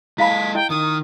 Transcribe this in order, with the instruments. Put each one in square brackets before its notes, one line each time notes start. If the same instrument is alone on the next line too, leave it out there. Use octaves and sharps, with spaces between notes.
[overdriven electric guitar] G#3 A4 [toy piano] E4 F5 B5 [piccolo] B6
[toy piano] E4 D#5 [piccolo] G5
[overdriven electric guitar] D#3 [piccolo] D#6